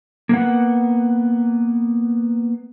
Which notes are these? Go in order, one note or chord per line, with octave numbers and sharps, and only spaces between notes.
A#3 B3 F#5